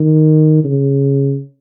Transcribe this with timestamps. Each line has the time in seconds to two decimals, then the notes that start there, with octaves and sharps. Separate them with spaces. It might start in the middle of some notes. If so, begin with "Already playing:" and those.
Already playing: D#3
0.64 C#3